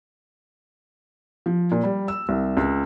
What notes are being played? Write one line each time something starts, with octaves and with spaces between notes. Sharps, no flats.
F3
A#2
G3
E6
C2
C#2